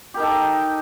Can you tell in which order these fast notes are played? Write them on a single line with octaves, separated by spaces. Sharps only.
G4 A#4 D#4 A4